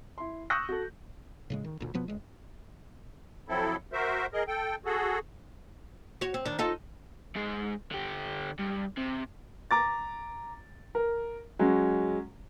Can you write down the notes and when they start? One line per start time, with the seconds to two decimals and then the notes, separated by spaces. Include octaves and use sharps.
0.18 E4 C6
0.50 C#6 D#6 E6 F#6 G6 A#6
0.69 F#4 A4
1.50 A2 C#3 G#3
1.64 D#3
1.80 D2 A#2
1.94 B2 F3 B3
2.08 C#2 G#3
3.48 F3 F#3 C4 E4 A4
3.93 F#4 A#4 C5 E5
4.33 G#4 A#4 D#5
4.48 A4 G5
4.85 F#4 G#4 A4
6.21 F#4 C#5
6.34 C4
6.45 D#3 D4
6.59 D#4 F4 A4
7.36 G#2 G#3
7.91 D3 G4
8.59 G2
8.97 C3
9.71 A#5 D6 A6
10.95 A#4
11.59 F#3 G#3 C#4